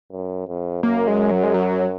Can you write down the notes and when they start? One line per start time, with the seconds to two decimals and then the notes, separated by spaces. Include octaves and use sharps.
0.12 F#2
0.48 F2
0.83 F#2 A#3
1.08 G#3
1.31 F#3
1.43 G#3
1.54 F#3